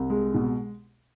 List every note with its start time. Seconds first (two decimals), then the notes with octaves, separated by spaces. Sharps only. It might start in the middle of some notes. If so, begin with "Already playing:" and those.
Already playing: C2
0.10 G#3
0.34 B2